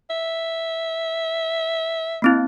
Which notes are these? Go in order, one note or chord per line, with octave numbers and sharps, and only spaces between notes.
E5
A#3 C4 E4